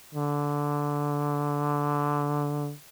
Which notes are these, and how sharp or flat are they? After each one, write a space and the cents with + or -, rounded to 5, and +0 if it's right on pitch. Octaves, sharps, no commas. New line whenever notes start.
D3 -10